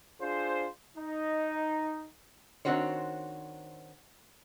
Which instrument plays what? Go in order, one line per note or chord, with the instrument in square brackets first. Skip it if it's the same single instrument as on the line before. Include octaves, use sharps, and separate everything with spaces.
[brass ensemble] D4 F4 G#4 C5
D#4
[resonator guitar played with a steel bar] D#3 C4 D4 F#4 C5 C#5